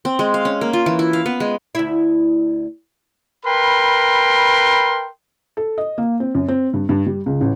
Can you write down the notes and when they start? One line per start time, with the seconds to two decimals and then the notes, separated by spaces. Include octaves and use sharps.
0.05 C4
0.19 G#3
0.34 F5
0.45 C#4
0.61 A#3
0.73 F4
0.86 E3
0.99 E4
1.13 F5
1.26 B3
1.40 G#3
1.75 D2 E4
3.45 A#4 B4 G5 B5 C6
5.57 A4
5.78 D#5
5.98 A#3
6.20 C4
6.35 F#2
6.48 C4
6.74 G2
6.89 G2
7.06 G3
7.26 C#2
7.41 A1